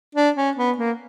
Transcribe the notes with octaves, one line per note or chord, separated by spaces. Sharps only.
D4
C#4
B3
A#3